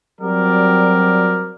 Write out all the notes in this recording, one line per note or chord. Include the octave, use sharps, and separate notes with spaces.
F#3 G3 C4 F#4 A#4 D5